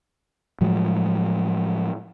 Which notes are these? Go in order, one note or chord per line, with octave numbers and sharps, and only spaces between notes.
A2 F3 F#3 G#3